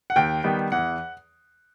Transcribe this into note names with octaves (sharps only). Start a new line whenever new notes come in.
F#5
D#2 G5
D#3 G3 B3
E2 F#5